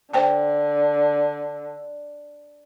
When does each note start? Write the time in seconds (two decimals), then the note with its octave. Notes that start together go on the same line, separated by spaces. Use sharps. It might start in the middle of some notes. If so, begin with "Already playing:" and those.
0.13 D3 C5 G5 A5